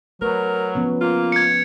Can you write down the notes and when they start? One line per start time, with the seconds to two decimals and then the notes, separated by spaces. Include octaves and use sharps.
0.22 F#3 A3 A#4 B4
0.75 F3 B3 C#4
1.01 A#3 F4
1.32 G#6 C#7